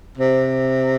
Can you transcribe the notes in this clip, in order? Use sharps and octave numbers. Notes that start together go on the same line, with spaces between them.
C3